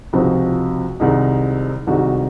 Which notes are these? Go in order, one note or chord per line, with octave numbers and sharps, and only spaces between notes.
C#2 C3 F3 C4 D#4 F#4
C2 C3 D#3 G#3 D#4
C2 C3 D#3 G#3 D#4 F#4